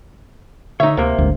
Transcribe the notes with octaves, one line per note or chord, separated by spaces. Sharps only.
D3 D#4 C#5 E5
D2 C3 A#3
G1 D2 G#2